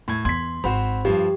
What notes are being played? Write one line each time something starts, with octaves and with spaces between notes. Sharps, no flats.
A2 G#6
E2 C6 G#6 B6
G#1 C4 F#4 C5 B5
G2 F3 G4